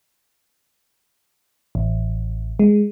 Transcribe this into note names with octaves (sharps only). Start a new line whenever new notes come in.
A1
G#3